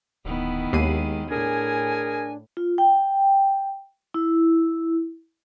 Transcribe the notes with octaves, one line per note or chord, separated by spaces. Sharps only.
D1 D#3 B3 E4
D#2 G#3 C7 D#7
A2 D4 G#4 A#4 G#5
F4
G5
E4